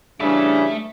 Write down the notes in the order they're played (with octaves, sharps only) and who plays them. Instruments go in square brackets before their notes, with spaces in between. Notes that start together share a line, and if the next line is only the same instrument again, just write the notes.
[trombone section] C#3 E3 G3 [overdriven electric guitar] A3 E5 [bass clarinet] D4